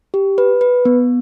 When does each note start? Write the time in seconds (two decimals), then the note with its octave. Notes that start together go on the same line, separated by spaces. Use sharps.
0.14 G4
0.38 B4
0.61 B4
0.85 B3